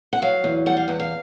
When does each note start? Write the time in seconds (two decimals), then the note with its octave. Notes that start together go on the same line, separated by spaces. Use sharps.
0.13 F#5
0.22 F#3 F5
0.44 E2
0.66 G3 F#5
0.77 F5
0.88 E2 F#5
1.00 F5